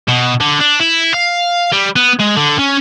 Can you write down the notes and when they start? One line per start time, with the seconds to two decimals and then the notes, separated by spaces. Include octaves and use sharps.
0.08 B2
0.40 D3
0.60 D4
0.80 E4
1.14 F5
1.72 G3
1.96 B3
2.20 G#3
2.36 D3
2.59 C#4